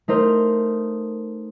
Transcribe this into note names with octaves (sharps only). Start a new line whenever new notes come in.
A3 D#4 A#4 C5